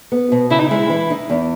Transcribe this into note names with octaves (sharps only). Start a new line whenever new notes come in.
B3
B2
C#3 E4
D#4
G#3 E4
E3
D#4
E2